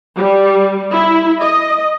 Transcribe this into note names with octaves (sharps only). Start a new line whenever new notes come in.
G3
E4
D#5